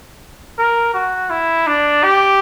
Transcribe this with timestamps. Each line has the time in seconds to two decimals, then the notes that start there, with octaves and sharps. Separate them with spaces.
0.58 A#4
0.94 F#4
1.30 E4
1.67 D4
2.03 G4